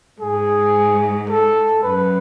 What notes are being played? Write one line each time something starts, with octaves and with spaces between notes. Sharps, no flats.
G#2 G#4
A4
F#2 B4